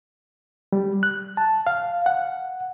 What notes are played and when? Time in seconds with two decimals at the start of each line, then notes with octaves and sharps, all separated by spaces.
0.72 G3
1.03 F#6
1.37 A5
1.67 F5
2.06 F#5